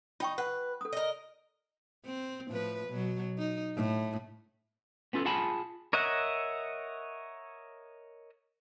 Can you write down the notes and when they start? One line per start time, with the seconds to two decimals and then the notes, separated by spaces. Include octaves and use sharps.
0.20 D#4 F4 G5 C#6
0.38 B4 F#5
0.81 A4 D#6
0.93 A#4 D#5
2.06 C4
2.49 A2 F3 B4
2.88 B2 F#3
3.38 D#4
3.76 A2
5.13 B3 C#4 F4 A4
5.25 F4 G#4 F#5 G#5 A5 B5
5.93 A#4 C#5 D#5 E5 F#5